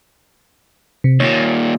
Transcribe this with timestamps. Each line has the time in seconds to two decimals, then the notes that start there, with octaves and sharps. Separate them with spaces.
1.04 C3
1.20 D#2 A#2 C#5